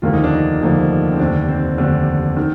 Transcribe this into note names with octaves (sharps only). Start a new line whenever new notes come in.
F1 D#2 D3 F3 A#3 F4
D#4
D4
D#4
F1 D#2 D3 F3 A#3
C4
F1 D#2 D3 D4
C4
F1 D#2 D3 D4
D#3